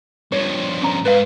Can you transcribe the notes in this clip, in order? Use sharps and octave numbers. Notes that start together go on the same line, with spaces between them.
G2 F3 C#5
C#4 A#5
G#2 B4 F5